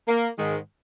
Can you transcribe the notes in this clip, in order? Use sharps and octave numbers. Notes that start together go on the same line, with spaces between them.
A#3
G#2 D#3 G#3